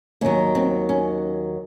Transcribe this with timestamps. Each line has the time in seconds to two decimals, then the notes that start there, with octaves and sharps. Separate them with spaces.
0.21 D#2 D#3 F#3 C#4
0.55 C4
0.89 C#4